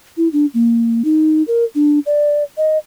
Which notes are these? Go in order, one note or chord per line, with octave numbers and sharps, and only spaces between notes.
E4
D4
A#3
D#4
A#4
D4
D5
D#5